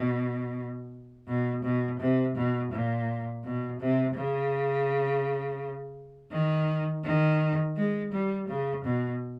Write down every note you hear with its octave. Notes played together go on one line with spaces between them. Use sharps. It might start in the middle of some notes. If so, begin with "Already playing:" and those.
Already playing: B2
B2
B2
C3
B2
A#2
B2
C3
C#3
D#3
D#3
G#3
G3
C#3
B2